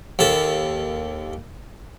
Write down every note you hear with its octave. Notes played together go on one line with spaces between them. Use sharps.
D#2 A4